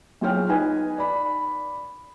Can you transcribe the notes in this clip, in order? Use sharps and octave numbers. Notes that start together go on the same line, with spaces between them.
B1 F4 G#4 C#5 G5 F6
D#4 B4 G#5
D5 B5